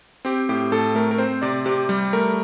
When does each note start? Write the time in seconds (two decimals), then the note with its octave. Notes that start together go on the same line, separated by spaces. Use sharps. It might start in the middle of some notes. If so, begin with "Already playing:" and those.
0.25 C4 G4
0.49 A2 G4
0.72 A2 A4
0.95 A3 A#4
1.11 A#4
1.18 C4 C5
1.42 C3 D5
1.66 C3 G4
1.89 G3
2.13 A3 A#4